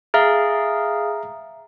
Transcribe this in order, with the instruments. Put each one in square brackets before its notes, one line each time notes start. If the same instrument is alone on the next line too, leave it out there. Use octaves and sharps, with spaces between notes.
[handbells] G#4 F5 [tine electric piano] E5 A#5 F6